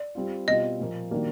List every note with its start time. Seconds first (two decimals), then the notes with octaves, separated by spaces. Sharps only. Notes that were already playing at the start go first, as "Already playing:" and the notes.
Already playing: D5
0.15 G3 C4 F4
0.48 B2 G3 C4 F4 D#5
0.79 A#2 F3 A#3
1.11 D#3 G3 A#3 D4 F#4